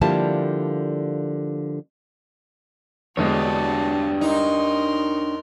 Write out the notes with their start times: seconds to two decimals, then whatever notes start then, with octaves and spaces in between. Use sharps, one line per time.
0.01 D3 F3 G3 A#3 E4 A5
3.17 E2 D3 G#3 D4 F#4 G4 C#5 A5
4.21 D#4 A#4 C6